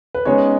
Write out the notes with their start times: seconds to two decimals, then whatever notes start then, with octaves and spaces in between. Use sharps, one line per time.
0.15 B4
0.25 C#3 G#3 B3 D#4 C#5